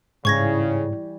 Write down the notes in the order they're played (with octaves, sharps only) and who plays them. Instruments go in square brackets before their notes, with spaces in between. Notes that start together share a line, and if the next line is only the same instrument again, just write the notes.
[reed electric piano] G#2 [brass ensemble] C#3 [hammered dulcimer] E3 G3 [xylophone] C#6 G#6 A#6